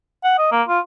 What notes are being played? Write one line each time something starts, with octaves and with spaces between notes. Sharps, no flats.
F#5
D#5
A#3
F4